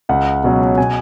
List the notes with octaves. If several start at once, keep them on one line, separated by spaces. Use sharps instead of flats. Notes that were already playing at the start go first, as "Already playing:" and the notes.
C#2 F#5
B2 F#3 C#4
B2 G#5